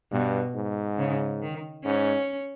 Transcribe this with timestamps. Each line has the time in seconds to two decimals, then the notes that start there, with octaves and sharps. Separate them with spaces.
0.12 G2 B2
0.55 G#2
0.98 C#3
1.42 D#3
1.84 G#2 C#4